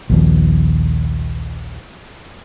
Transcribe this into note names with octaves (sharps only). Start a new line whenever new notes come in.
A#1 D#2 F3